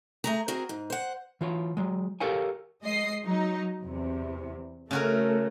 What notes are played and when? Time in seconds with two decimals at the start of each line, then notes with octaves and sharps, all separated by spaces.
0.24 A3 G#4 A#5
0.48 C4 F#4 G#4 A#4
0.69 G#2
0.90 C5 F#5
1.41 E3 F4 C#5
1.77 F#3 G#3
2.20 G4 A4 A#4 C#5 F5 G#5
2.83 G#3 D#5 C7
3.24 F#3 D#4
3.83 E2 C3
4.91 C#3 A3 F#4 A#4